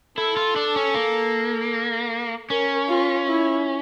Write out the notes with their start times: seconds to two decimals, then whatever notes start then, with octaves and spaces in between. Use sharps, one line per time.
0.17 E4 A4
0.37 F4
0.56 D4
0.76 C#4
0.94 A#3
2.49 C#4 A#4
2.88 F4
3.27 E4